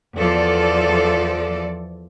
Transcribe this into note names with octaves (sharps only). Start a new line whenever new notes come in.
E2 F3 A4 D5